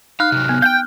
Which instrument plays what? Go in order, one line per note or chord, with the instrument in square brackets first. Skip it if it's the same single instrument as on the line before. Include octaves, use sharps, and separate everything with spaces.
[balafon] D#4 [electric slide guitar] F5 [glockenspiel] F6 F#6
[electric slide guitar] C3 F#3
[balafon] B3
[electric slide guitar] F5 G5 [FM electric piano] G6